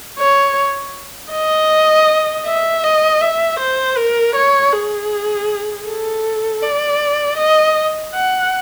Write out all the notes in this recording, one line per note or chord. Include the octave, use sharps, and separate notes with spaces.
C#5
D#5
E5
D#5
E5
C5
A#4
C#5
G#4
A4
D5
D#5
F#5